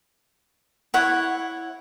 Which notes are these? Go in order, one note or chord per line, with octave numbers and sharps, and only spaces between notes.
E4 C#5 F#5